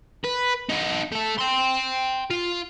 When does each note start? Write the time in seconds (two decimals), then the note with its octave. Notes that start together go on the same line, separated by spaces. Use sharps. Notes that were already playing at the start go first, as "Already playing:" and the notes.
0.25 B4
0.70 D#4 F#4
1.12 A3 A4
1.38 G5 C6
2.30 F4